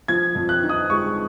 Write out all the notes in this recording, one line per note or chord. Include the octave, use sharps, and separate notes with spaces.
F3 G#6
F2
F#6
D#4
D#6
G#3 C#6